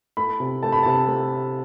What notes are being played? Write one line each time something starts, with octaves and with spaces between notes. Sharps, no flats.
A3 B5
C3
A3 A5
B5
C3 A5
A3